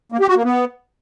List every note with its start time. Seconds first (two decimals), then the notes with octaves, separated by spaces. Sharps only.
0.12 A#3
0.20 G4
0.28 F#4
0.36 A#3
0.44 B3